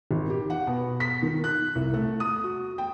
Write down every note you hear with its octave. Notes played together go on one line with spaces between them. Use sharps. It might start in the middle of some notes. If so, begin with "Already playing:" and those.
G#1
G4
F#5
B2
B6
D#3
F#6
C2
A3
D#6
F#4
G5